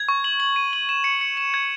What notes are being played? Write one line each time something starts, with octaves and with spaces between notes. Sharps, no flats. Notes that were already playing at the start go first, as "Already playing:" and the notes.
Already playing: G#6
C#6
F#7
F#7
D#7
F#7
E7
C#7
C#7
E7
G#6